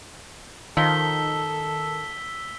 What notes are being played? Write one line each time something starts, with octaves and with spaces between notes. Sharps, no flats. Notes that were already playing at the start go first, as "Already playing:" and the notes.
D#3 F3 D#4 A4 E6 B6 G7